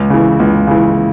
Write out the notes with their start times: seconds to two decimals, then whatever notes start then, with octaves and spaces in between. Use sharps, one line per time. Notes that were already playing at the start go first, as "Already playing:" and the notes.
Already playing: C#2
0.10 C#3 E3
0.40 C#2
0.67 C#3 E3